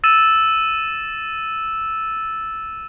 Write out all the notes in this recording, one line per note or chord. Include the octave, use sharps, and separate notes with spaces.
E6 A6 D#7 E7